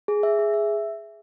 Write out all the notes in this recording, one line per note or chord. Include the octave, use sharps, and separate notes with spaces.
G#4
E5
G#4
E5